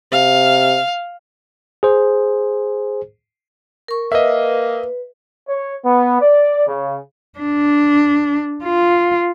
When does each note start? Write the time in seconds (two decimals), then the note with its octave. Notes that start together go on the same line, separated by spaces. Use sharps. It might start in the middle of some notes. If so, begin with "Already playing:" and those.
0.12 C3 F5
1.83 G#4 C5
3.88 A#4 C#6
4.12 A#3 B4 D#5 E5
5.48 C#5
5.84 B3
6.21 D5
6.67 C#3
7.39 D4
8.64 F4